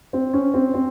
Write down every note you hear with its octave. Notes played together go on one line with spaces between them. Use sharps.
C4
C#4
C4
C4